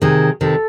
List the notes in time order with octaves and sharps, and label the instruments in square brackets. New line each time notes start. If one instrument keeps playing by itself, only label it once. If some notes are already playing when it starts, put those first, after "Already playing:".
[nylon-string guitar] C3 D#3 [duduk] G#4
[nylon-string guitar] C3 D#3 [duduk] A4